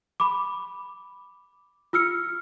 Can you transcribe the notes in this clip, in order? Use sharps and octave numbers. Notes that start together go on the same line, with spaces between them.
B5 D6
F4 E6 F6 C#7